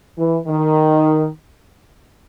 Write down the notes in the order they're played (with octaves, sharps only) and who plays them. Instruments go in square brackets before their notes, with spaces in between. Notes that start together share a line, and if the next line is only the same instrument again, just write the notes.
[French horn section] E3
D#3